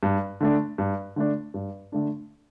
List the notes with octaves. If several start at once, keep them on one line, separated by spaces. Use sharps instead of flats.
G2
D3 A3 D4
G2
D3 A3 D4
G2
D3 A3 D4